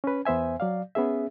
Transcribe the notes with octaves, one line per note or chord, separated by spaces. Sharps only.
C#4 B4
E2 B3 C5 E5 G#5
F#3 D5 F5
B3 C#4 G#4 E5